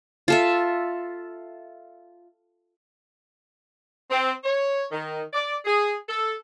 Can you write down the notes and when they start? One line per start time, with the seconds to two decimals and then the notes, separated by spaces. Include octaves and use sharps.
0.28 F4 A4 E5
4.11 C4
4.44 C#5
4.91 D#3
5.33 D5
5.65 G#4
6.08 A4